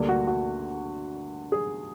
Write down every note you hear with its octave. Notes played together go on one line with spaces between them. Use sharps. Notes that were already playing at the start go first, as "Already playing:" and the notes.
Already playing: D2 D3 G3 A#3
F#4
F#4
G#4